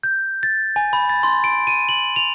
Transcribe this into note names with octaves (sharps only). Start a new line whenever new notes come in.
G6
A6
G#5
B5
A6
C6
D7
D#7
F#7
F7